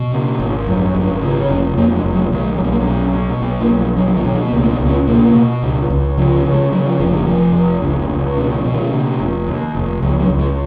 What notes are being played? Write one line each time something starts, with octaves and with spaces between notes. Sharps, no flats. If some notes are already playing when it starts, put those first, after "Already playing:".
Already playing: B2
C#3
G#1
F#2
G#1
C#3
F1
F2 A#3
F#3
G#3
F1
F#3
B1 D#3
F#3
B1 G#3
A#3
B3
B2 C#4
B2
B1 B3
A#3
B1
F3
B2 F#3
F3
D#3
B2
F3
B3
C#2 A#3
A#3
B3
C#2
C#4
B2 A#3
B2
C#2
C#2
C#3 F3
F3
C#3
G#3
C#3 F#3
F3
F1 F3
D#3
F2 F3
F1
C#2
C#2
B2 D#3
F3
B2
D#3
C#3
F1
D#2
F1
C#2 F3
F#3
C#2
G#3